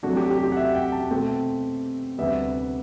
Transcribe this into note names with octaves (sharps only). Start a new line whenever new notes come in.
C3 F#3 A3 D4 F#4
G4
G4
G4
F#5
E5
G5
A5
B2 A3 C4 G5
D2 C3 G3 B3 E5